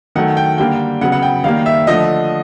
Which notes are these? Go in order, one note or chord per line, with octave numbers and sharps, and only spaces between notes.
D#3 F#3 A3 F#5
G5
D3 G3 A#3 G5
C#3 F#3 B3 F#5
F#5
G5
D#3 G3 A#3 F5
E5
D3 F3 A3 D#5